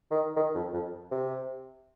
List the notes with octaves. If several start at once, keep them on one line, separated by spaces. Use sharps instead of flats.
D#3
D#3
F2
F2
C3